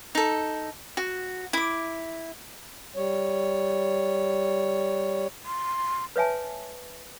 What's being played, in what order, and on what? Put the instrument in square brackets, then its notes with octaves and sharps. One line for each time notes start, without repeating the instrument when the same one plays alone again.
[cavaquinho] D#4 A4
F#4
E4 D6
[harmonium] G3 C#5
[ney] C6
[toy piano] B4 C#5 E5 G#5 A5